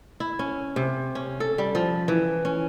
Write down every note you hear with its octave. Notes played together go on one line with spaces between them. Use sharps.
E4
C#4
C3
C#4
A4
G3
F3
E3
C#4